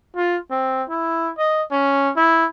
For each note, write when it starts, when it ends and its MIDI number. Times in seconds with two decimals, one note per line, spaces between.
0.16 0.37 65
0.51 0.83 60
0.90 1.31 64
1.38 1.63 75
1.71 2.11 61
2.16 2.46 64